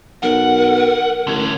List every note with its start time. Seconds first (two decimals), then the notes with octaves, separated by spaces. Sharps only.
0.23 B1 A#4 F#5
1.27 A1 D3 C#4